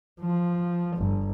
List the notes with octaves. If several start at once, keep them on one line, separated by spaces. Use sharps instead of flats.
F3
G1